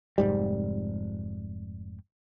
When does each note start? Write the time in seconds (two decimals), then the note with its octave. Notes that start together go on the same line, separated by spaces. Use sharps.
0.18 F1 G#2 G3